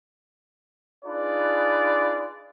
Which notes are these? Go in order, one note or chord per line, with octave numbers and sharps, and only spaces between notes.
D4 D#4 F4 G#4 B4 D5